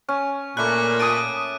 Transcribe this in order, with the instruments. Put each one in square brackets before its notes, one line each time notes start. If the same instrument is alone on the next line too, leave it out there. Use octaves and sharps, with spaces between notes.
[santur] C#4 [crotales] C#6
[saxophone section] A#2 [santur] A3 B5 [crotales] D6 F#6
[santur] A5 D#6 [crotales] D7 D#7